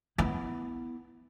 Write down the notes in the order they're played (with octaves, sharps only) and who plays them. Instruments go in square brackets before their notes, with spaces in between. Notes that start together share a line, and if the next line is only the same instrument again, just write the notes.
[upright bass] B3 E4